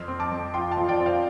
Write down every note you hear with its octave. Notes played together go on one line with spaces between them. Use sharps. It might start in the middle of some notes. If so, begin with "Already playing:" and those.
Already playing: F2 C6 F6
C4
A5 D6
F2
F4 G5 C6
F5 A5
F3
D5 G5
C4
C5 F5